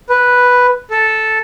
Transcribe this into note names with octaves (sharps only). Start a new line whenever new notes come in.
B4
A4